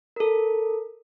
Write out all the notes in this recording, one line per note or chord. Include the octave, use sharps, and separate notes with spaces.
A4 A#4